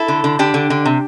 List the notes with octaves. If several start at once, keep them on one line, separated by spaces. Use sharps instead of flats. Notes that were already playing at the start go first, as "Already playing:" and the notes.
Already playing: E4 A4
D3
D3
D3 D4 G4
D3
D3
C3